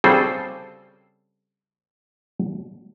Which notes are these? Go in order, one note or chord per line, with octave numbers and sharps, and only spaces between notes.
C#3 G3 C4 G#4 A4 C5